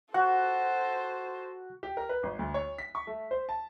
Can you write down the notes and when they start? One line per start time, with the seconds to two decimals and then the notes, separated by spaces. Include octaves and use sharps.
0.14 F#4 A4 C5 F#5
1.83 G4
1.97 A#4
2.09 B4
2.23 G#1
2.39 D2
2.54 C#5
2.78 B6
2.95 C#6
3.07 A3
3.31 C5
3.49 A5